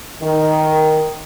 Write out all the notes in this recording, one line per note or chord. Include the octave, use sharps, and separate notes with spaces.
D#3